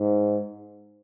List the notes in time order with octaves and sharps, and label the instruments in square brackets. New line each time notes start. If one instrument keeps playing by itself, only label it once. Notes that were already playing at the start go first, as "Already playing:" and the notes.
Already playing: [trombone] G#2